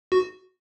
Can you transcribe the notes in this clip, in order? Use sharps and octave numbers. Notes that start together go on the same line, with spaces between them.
F#4